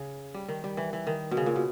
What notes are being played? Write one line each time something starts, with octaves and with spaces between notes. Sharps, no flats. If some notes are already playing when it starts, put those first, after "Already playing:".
Already playing: C#3
G3
D#3
G3
E3
E3
D#3
B2
C#3
A#2
B2